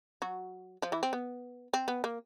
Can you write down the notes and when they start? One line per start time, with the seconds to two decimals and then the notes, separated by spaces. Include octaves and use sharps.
0.22 F#3 F#4
0.82 F3 F4
0.92 E3 E4
1.03 C4
1.13 B3
1.74 C4
1.88 B3
2.04 A#3